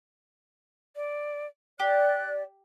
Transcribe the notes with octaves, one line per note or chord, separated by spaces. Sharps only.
D5
G4 D5 F#6